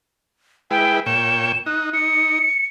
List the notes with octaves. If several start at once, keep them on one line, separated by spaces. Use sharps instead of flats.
G#3 E4 B4 G5
A#2 C#5 G5 E7
D#4 F#6
D#4 C#7